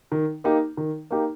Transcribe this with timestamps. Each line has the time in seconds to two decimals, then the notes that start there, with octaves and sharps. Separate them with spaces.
0.12 D#3
0.44 A#3 D#4 G4
0.77 D#3
1.11 A#3 D#4 G4